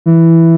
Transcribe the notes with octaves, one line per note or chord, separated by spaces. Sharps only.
E3